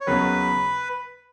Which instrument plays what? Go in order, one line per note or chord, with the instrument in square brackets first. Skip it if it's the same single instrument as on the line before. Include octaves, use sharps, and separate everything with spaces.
[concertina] C#5
[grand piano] D#2 C#3 F#3 B3 [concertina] B4